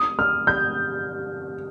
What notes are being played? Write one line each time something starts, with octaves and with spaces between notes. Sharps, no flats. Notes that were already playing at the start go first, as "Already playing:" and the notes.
Already playing: D#6
F6
G6